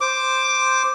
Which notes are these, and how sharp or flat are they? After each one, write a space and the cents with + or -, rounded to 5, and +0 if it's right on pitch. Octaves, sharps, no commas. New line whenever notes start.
C5 +0 D6 +5